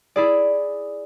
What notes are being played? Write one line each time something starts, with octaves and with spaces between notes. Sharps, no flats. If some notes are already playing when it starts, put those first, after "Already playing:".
E4 G#4 D5